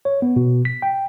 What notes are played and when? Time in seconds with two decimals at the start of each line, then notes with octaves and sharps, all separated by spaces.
0.05 C#5
0.22 B3
0.36 B2
0.65 B6
0.82 G5